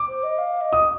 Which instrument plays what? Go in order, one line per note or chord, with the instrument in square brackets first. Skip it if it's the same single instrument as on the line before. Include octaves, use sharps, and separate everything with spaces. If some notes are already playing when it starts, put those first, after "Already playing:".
Already playing: [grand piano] D6
[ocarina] C5
D#5
F5
D#5
[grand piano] D#6